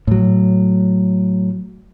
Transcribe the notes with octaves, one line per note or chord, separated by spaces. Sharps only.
A2 F#3